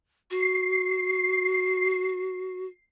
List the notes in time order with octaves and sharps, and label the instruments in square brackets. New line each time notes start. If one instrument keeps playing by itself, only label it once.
[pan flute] F#4 [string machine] C7